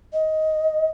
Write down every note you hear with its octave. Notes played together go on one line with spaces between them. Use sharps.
D#5